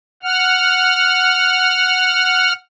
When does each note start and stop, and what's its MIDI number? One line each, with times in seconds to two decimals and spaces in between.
0.23 2.53 78
0.23 2.53 89